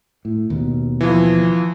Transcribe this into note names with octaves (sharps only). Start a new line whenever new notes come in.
A2
D#2 B2
E3 F3